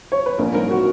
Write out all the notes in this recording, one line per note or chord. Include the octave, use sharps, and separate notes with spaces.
C#5
B4
A#1 A#4
G#2 A#4
F#4